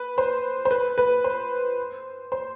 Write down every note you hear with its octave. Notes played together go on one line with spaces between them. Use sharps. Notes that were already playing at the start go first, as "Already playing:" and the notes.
Already playing: B4
C5
C5
B4
B4
C5
C5